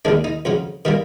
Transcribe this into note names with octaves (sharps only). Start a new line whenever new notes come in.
D#2 D#3 G#3 D4
D#4
F2 C#3 F#3
D#3 G3 A#3